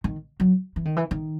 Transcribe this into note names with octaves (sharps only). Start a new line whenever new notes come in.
D#3
F#3
E3
D#3
E3
D#3